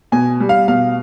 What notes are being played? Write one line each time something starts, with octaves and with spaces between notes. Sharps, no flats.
B2 G#5
G3
F5
B2 F5